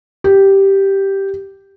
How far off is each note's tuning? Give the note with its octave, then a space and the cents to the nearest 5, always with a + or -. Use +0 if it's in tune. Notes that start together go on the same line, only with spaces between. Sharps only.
G4 -5